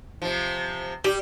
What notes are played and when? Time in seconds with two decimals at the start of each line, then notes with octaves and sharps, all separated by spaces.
0.22 C3 F3
1.04 G3 G4